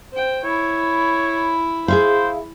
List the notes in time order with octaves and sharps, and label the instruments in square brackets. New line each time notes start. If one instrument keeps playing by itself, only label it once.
[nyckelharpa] C5 G5
[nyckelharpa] E4 B5 [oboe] C#5
[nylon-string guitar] G#4 E5 F5 [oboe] C5